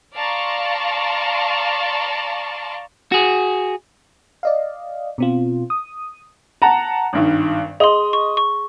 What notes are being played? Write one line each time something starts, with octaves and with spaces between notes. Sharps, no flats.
D5 F5 A5 A#5 C6 C#6
F#4 G#4
D5 D#5 F5
B2 C4 F4
D#6
F#5 A5 A#5
G#1 G2 D#3
G#4 D#5 C6
C#6
C#6